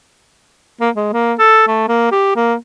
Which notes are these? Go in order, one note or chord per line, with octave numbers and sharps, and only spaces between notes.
A#3
G#3
A#3
A4
A3
A#3
G4
A#3